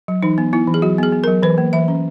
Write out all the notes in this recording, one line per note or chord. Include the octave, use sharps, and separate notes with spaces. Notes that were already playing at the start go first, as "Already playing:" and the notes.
F#3
E3 D#4
B3
B3 E4
E3
G#4
F#3 F#4
B3 G#4
B3
F#3 A#4
E3 B4
A#3
E3 E5
C#4